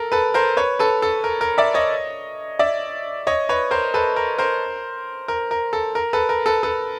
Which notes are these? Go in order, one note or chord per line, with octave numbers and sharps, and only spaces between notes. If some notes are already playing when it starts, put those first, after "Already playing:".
Already playing: A4 A#4
A4 B4
A#4 C5
B4 C#5
A4 B4
A4
A#4
A#4
D5 E5
C#5 D#5
D5 E5
C#5 D#5
B4 C#5
A#4 C5
A4 B4
A#4
A#4 C5
A#4
A#4
A4
A#4
A4 B4
A#4
A4 B4
A4 B4